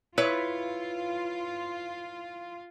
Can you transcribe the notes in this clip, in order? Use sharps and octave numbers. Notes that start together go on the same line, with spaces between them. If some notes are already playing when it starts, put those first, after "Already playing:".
E4 F4 B4 C#5